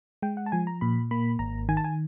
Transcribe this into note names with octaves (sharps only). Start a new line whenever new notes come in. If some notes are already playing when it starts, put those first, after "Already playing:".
G#3 G5
F#5
A5
F3 G#5
A#5
A#2 B5
A#3 B5
G#1 A#5
D#3 G#5
A5
G#5